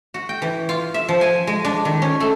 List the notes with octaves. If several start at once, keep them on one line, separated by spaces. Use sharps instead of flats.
F#4
G5
E3
F4
E5
F3
G#5
G#3
D4
D#3
C#4
A3